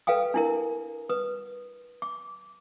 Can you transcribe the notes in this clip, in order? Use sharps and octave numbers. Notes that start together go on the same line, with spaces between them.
A4 B4 F5 G5 D#6
D4 E4 A#4
B4 D#6
D6